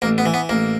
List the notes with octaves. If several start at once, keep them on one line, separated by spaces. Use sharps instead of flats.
A1 A#3
B3
E3
B3
A1 A#3